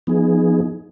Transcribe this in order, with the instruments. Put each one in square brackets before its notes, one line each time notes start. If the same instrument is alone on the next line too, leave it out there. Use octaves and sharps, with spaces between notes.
[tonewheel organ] F3 B3 D#4 G#4